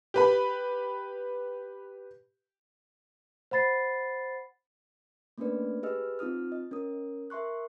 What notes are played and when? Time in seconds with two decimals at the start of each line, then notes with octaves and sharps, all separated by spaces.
0.14 G4 B4 B5
3.51 C5 F#5 B5 A6 C7
5.38 A3 A#3 C#4 D4 B4 D5
5.83 G4 G#4 B4 D#5 E6 F6
6.19 C4 D#4 F4 D#6 F6
6.52 D#5
6.71 C#4 A#4 D#6
7.30 A#4 E5 C6 C#6 F#6